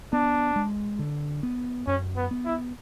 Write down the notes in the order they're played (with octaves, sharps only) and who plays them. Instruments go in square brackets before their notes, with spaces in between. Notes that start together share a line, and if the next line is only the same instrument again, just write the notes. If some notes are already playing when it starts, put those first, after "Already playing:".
[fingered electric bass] B3 [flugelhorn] D4
[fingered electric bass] G#3
D3
B3
[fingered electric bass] F#2 [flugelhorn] C#4
[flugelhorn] B3
[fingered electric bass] B3
[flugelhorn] E4